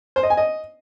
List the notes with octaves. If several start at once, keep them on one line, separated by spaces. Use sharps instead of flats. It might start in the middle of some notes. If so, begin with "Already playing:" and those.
C5
D#5
G#5
D#5